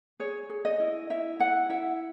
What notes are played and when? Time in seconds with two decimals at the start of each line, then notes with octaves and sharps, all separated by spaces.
0.20 G#4 C#5
0.50 G#4
0.65 D#5
0.80 E4
1.10 E4 E5
1.40 E4 F#5
1.70 E4 E5